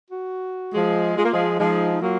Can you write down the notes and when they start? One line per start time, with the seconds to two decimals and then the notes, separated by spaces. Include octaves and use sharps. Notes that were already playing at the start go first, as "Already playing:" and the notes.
0.10 F#4
0.74 F3 G#3
1.16 G#3 F4
1.25 A#3
1.33 F3 G#3
1.59 F3 G#3 D#4
1.92 D#4
2.01 F#3 A#3 F4